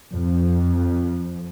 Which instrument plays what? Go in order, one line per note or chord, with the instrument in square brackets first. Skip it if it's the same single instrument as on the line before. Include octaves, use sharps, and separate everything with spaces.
[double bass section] F2